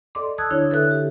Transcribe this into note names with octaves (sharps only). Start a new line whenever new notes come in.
A4 D5 D#5 C6 D6
A5 D#6 E6 F#6 G#6
D3 D4 E4 C#5 D#6
D3 A4 B4 E5 F#6
G4